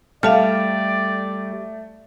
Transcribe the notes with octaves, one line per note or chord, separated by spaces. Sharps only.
G3 A3 D5 F5 A5 F6